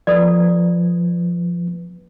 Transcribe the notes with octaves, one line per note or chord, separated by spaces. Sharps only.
F3 A4 B4 D5